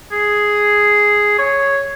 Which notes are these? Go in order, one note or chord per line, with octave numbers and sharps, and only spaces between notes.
G#4
C#5